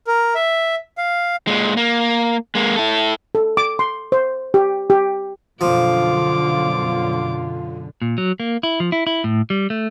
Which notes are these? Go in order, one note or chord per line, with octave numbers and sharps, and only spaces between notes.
A#4
E5
F5
A#2 G#3
A#3
G#3 A#3
E4 A4
A4
D6
C6
C5
G4
G4
F#2 B2 D3 F3 F4 D6
A#2
F#3
A#3
E4
F3
E4
E4
A2
G3
A3